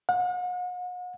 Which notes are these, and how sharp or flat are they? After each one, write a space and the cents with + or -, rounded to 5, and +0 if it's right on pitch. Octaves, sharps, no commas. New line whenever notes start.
F#5 -40